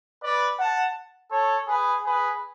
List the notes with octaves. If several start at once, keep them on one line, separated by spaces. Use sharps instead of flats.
B4 D5
F#5 A5
A4 C#5
G#4 B4
G#4 B4